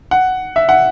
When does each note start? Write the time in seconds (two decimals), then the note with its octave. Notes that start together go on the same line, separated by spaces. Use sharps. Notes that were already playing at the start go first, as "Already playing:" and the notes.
0.11 F#5
0.56 E5
0.69 F#5